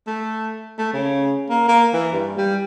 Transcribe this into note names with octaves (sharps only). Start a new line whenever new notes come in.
A3
A3
C#3
A#3
A#3
E3
G2
G3